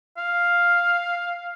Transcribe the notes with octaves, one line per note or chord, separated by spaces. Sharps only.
F5